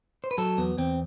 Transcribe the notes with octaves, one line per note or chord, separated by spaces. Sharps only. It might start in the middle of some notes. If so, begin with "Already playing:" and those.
C5
B4
F#3 A4
E2 B3
E2 C4